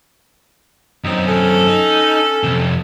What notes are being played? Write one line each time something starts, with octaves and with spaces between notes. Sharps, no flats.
F#2 C4 D#4
C#4 A4
D#4
F2 C3